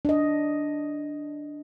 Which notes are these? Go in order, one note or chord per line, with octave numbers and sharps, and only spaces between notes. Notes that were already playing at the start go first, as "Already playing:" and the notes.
D4 D#5